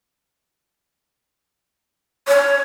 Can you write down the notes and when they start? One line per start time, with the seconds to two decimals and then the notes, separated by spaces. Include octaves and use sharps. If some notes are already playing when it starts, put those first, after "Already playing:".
2.28 C#5